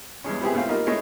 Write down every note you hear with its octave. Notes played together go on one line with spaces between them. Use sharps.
E2 G2 G#3 C#4
G3 B3 C4 E4 G4 G#4
C#2 A3 C4 F5
G3 A#3 D#4 F4 A#4
G#3 A3 E4 C#5 D#5